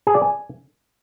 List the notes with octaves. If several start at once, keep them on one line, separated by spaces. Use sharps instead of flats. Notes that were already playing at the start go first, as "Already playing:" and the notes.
G#4
D5
G#5